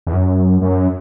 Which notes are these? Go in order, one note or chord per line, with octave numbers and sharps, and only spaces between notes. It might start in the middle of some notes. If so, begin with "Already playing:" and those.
E2
F#2
F#2